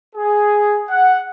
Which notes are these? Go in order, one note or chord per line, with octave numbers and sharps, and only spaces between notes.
G#4
F#5